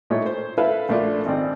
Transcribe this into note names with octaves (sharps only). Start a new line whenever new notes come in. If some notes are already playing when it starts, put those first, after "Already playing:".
A#2 A3 D#4 E4 C#5
C5
E4 A4 B4 E5 F5
A#1 A3 D4 F4
G#1 C4 D5